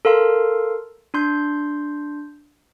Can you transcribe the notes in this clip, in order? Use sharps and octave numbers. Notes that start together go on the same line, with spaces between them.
A4 A#4 F5 C6
D4 C6 G6